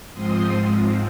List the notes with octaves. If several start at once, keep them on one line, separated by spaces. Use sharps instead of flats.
G#2 F3 C4 C6 D#6